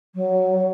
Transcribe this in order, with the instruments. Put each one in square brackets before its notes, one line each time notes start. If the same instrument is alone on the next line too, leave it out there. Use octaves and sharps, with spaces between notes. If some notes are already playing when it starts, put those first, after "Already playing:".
[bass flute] F#3